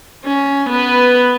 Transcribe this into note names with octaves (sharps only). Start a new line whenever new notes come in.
C#4
B3 B4